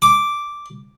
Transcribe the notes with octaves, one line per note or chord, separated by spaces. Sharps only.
D6